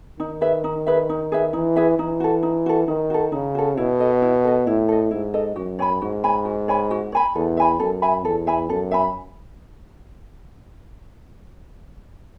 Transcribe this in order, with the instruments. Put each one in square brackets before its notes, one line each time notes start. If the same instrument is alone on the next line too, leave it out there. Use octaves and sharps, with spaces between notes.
[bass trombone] D#3 [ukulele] D#4
[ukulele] G#4 B4 E5
D#4
G#4 B4 E5
D#4
G#4 B4 E5
[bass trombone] E3 [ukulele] D#4
[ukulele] G#4 B4 E5
[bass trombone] E3 [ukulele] D#4
[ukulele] F#4 A4
D#4
F#4 A4
[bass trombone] D#3 [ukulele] D#4
[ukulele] F#4 A4
[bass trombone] C#3 [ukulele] D#4
[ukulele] F#4 A4
[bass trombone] B2 [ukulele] E4
[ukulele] A4 D#5
E4
A4 D#5
[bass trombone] A2 [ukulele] E4
[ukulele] A4 D#5
[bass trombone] G#2 [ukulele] E4
[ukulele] A4 D#5
[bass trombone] F#2 [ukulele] F#4
[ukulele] C#5 G#5 B5
[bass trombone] G#2 [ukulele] F#4
[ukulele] C#5 G#5 B5
F#4
C#5 G#5 B5
F#4
C#5 G#5 B5
[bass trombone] E2 [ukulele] A4
[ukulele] E5 G#5 B5
[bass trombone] F#2 [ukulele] A4
[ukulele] E5 G#5 B5
[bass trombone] E2 [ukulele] A4
[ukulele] E5 G#5 B5
[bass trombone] F#2 [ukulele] A4
[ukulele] E5 G#5 B5